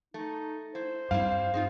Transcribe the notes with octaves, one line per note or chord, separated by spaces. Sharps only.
A3 D#4
E4 C5
G2 G3 C4 E4 F5
C4 D#4 F4 G#4